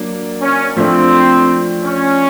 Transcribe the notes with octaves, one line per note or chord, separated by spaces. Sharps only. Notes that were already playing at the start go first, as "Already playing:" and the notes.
Already playing: F#3 A#3 D4
C#4
F3 A3 C4 D4
C#4